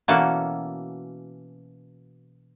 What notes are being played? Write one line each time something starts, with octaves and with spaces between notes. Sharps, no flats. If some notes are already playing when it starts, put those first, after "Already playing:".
B2 E3 A#3 C#4 F#4 A4